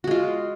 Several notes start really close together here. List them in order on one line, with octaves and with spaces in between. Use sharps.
F#4 G#3 F4